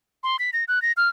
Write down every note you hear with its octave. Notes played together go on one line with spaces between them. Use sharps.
C6
B6
A#6
F#6
A#6
F6